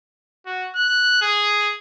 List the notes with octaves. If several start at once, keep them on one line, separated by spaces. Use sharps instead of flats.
F#4
F#6
G#4